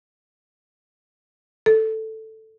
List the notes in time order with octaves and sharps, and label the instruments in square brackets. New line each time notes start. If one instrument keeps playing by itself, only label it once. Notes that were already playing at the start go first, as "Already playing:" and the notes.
[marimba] A4